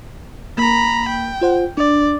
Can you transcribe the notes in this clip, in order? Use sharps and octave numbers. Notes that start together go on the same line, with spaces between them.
A#3 A#5 B5
G5
F4 C5 F#5
D4 D5